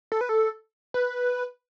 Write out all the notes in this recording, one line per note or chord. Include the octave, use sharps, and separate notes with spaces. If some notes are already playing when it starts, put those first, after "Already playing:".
A4
B4
A4
B4